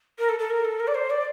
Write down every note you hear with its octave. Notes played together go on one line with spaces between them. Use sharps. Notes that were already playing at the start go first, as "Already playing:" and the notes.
A#4
A4
A4
A#4
A4
A#4
D5
C5
D5